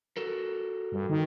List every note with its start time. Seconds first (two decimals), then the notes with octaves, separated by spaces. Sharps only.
0.17 F#4 A4 A#4
0.92 G2
1.09 D#3